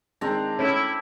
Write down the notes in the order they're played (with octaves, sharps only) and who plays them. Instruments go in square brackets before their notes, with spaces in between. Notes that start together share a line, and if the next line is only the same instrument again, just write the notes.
[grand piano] D#3 G#3 [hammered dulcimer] C4 D4 A#5
[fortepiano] A3 C#4 [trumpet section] E4